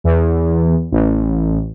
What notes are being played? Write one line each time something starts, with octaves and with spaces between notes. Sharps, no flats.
E2
A1